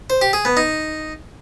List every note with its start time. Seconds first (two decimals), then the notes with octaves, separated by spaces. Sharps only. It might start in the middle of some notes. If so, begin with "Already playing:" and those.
0.10 C5
0.22 G4
0.33 G#4
0.45 B3
0.57 D#4